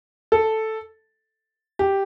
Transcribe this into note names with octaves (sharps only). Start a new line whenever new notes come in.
A4
G4